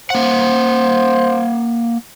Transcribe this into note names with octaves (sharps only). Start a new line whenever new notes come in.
A#3 C5 F#5